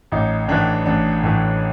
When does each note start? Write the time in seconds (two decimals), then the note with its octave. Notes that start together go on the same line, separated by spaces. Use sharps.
0.12 A1 D#4
0.48 A2 E3 D4
0.86 A1 D4
1.23 A2 E3